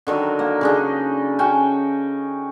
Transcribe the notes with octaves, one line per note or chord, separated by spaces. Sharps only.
D3 D#3 F#3
A#3
C#3 D4 D#4
C#4 F#4 G5 A5